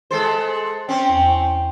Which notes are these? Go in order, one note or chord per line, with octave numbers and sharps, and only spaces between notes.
G#3 A4 C5
C4 C#4 G5
E2